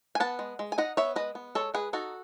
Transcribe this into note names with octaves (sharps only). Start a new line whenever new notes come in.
G#5
B3 F#5 A5
G#3
G#3
G#5
D#4 D#5 F#5
B3 C#5 E5
G#3 B4 D#5
B3
G#3 A4 C#5
G#3 G#4 B4
D#4 F#4 A4